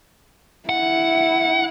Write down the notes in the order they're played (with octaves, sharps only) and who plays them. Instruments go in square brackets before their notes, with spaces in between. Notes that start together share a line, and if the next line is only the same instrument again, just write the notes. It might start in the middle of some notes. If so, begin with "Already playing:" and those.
[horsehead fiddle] E4 [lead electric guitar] F#5